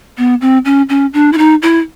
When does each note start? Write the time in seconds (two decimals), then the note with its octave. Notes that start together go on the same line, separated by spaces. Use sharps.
0.18 B3
0.41 C4
0.65 C#4
0.89 C#4
1.14 D4
1.33 E4
1.38 D#4
1.62 E4